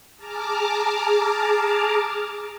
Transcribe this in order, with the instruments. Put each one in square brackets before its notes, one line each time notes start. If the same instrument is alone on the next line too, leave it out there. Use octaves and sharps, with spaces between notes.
[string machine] G#4 A5 A#5 D6 F6